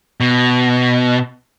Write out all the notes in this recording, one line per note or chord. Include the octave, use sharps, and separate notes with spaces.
B2